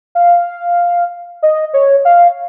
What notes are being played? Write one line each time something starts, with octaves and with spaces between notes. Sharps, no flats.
F5
D#5
C#5
F5